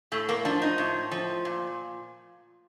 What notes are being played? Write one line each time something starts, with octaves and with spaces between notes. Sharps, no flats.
A2 A3
A#3
F3 D4
D#4
A2
F3
A#2